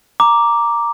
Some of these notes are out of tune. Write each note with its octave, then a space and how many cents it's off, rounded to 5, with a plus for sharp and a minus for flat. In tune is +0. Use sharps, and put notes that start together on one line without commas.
A#5 +0 D6 +0